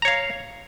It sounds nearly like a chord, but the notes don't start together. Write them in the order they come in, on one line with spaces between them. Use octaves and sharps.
A#5 C#5 F5